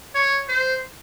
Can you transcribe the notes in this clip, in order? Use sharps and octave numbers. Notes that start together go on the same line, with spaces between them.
C#5
C5